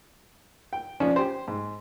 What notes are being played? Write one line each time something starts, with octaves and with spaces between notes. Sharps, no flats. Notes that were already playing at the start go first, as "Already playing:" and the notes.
G5
F3 C#4 D4
G4 C5
G#2